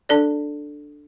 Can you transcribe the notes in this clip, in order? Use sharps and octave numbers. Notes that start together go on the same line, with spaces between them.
D4 A4 D5